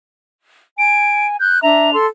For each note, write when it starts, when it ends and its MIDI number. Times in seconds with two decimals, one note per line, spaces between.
0.79 1.37 80
0.79 1.27 98
1.40 1.62 90
1.40 1.59 91
1.63 1.93 62
1.63 1.93 76
1.63 1.93 82
1.63 1.96 101
1.94 2.05 69
1.94 2.05 84